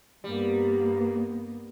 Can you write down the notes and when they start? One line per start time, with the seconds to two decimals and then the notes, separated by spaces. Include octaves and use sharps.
0.24 G2 G3 A#3 B3